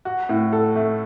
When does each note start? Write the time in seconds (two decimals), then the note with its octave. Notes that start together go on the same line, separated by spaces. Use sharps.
0.05 F#4
0.29 A2
0.53 A4
0.76 A3